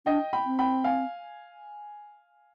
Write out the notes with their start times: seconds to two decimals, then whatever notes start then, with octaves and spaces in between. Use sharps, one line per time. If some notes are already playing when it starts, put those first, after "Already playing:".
0.06 D4 D#5 G5
0.33 G5 B5
0.46 C4
0.59 G5 B5
0.84 F5 G#5